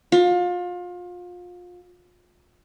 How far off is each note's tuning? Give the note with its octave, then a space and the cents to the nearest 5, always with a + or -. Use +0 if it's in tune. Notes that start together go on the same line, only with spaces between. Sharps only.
F4 +30